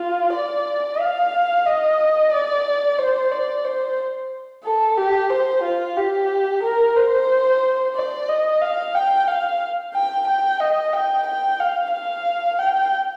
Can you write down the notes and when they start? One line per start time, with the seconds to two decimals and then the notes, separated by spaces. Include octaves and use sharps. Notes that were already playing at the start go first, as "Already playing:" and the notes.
Already playing: F4
0.34 D5
1.00 F5
1.66 D#5
2.32 D5
2.99 C5
3.32 D5
3.65 C5
4.64 A4
4.98 G4
5.30 C5
5.63 F4
5.97 G4
6.63 A#4
6.96 C5
7.95 D5
8.28 D#5
8.62 F5
8.95 G5
9.28 F5
9.94 G5
10.27 G5
10.60 D#5
10.93 G5
11.27 G5
11.60 F5
11.92 F5
12.59 G5